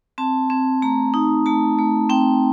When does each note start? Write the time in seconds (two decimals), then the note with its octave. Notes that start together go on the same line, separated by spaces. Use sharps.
0.18 C4 A5
0.50 C4
0.82 A3 A#5
1.14 D#4
1.46 A3 A5
1.79 A3
2.10 C4 G5